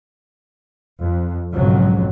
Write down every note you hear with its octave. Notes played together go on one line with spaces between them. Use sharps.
F2
B1 F2 G#2 C#3 F#3